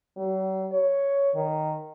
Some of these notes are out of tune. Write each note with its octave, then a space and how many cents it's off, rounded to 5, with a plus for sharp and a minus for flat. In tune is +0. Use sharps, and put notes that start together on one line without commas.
F#3 +45
C#5 +5
D#3 -10